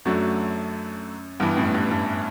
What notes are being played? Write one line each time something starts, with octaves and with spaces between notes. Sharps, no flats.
F#2 F#3 A3 D4 F#4
G2 E3 G3 B3
F#2 A2
G2
G2